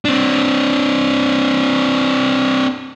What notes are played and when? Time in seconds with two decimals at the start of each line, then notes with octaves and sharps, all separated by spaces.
0.05 C4 D4